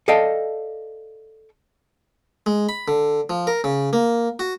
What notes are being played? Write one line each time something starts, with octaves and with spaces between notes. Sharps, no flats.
A4 D5 D#5 F5 G5 A5
G#3
B5
D3
F3
A#4
C#3
A#3
F#4